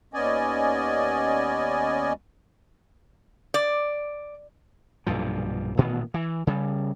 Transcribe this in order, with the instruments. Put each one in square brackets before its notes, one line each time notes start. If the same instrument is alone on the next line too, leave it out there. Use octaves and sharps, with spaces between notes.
[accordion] D#2 B3 C#4 D5 D#5 G#5
[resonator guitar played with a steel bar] D5
[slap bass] B1 G2 A#2 F3
A1 A#2 D#3 B3
E3
C#3 G3